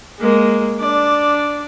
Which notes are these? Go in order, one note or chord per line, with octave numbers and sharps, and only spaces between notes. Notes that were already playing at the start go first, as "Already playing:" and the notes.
G#3 A#3
D4 D5